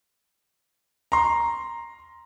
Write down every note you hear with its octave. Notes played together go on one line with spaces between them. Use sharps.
A#5 C6